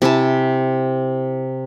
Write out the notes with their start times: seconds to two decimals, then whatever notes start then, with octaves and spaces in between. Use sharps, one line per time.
0.02 C3 E4 G#5 A5